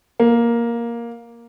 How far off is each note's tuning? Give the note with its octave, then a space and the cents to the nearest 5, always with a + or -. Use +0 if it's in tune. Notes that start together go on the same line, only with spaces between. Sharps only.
A#3 +10